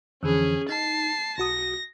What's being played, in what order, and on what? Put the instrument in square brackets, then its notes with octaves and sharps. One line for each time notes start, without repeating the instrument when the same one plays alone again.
[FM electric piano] F2 D3 E3 [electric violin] C#4 G#4
[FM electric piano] D#4 [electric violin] A5 C7
[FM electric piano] B1 F#4 D#6 [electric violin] A#6